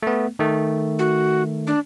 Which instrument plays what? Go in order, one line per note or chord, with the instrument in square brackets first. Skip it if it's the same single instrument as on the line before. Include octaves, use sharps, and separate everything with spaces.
[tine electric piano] A3 B3
D#3 A3
[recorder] F#4
D4